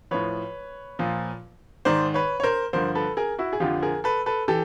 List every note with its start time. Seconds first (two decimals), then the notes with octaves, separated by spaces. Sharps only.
0.11 A2 F3 B4 C#5
0.99 A#2 F3
1.85 G#2 D#3 C5 D5
2.14 B4 C#5
2.40 C#5
2.43 A#4 C5
2.73 G2 D3 F3 A#4 C5
2.95 A4 B4
3.17 G#4 A#4
3.39 E4 F#4
3.53 G#4
3.60 F2 D3 F3 F4 G4
3.82 G#4 A#4
4.04 A4 B4
4.26 A4 B4
4.48 E3 G4 A4